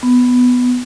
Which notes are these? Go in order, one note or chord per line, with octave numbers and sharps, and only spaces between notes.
B3